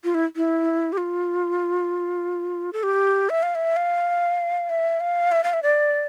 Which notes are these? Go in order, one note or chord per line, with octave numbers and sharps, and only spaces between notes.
F4
E4
E4
G4
F4
A4
G4
E5
F5
E5
F5
E5
F5
E5
F5
E5
D5